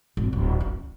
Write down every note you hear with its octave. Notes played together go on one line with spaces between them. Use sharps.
G#1
D1
C#4